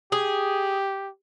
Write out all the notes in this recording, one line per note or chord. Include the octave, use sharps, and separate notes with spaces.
G4 G#4